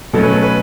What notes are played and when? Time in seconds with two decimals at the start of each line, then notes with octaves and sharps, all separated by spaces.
0.13 B2 F#3 A3 C#4 A4
0.23 B4
0.33 A4
0.43 B4